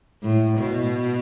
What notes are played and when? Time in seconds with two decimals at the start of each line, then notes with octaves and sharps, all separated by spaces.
0.22 A2
0.58 B2